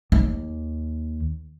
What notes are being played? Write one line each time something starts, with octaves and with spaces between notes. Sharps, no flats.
D#2